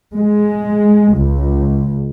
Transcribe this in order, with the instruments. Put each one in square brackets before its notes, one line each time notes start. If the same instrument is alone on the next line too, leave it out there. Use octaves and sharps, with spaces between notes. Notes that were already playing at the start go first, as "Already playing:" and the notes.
[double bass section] G#3
C#2